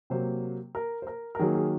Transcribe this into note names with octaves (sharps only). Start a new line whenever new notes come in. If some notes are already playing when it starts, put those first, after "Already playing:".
C3 F#3 A#3 C5
A#4
C5
A#4
A#4
D#3 F#3 A#3 G#4
G#4